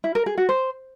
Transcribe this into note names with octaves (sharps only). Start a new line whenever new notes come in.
E4
A#4
G#4
F#4
C5